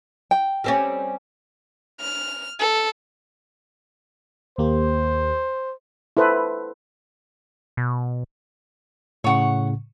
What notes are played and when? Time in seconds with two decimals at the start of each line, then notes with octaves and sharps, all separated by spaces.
0.31 G5
0.64 G3 C4 C#4
2.01 F6
2.60 A4
4.58 D#2 A#3 G4 C5
6.17 E4 A4 B4 C5
7.77 B2
9.24 A2 C#3 C#5 F#5